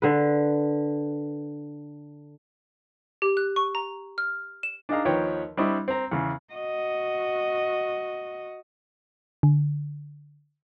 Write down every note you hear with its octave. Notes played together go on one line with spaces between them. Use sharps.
D3 B4
G4
F#6
C#6
A#5
F6
E7
D4 D#4 G#4 D#5 F5 A#5
D#2 F3 B4 C#5 G5 A#5
G3 C4 D4 E4 D#5 C#6
C4 A#5
E2 C#3
F#4 D#5
D3